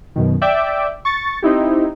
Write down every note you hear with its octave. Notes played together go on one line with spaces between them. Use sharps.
F#2 B2 D#3
D5 E5 G5 D6
C#6 A6
C4 D#4 E4 G4